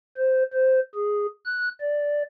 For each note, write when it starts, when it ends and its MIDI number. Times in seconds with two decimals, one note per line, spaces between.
0.17 0.43 72
0.53 0.80 72
0.95 1.27 68
1.45 1.69 90
1.80 2.22 74